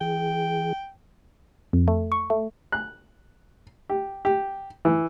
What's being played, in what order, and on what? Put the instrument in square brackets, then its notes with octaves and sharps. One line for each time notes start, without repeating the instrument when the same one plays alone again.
[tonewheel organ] E3 G#4 [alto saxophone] G5
[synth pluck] F2
A3
C#6
A3
[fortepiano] F#6
G4
G4
E3